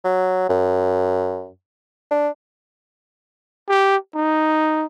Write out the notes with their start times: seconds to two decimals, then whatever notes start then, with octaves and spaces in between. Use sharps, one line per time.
0.04 F#3
0.49 F#2
2.11 D4
3.68 G4
4.15 D#4